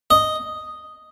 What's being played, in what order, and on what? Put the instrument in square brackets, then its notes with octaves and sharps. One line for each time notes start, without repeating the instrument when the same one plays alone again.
[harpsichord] D#5